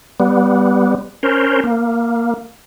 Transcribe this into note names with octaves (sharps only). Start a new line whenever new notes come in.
G3 B3
C#4 A#4 C5
A#3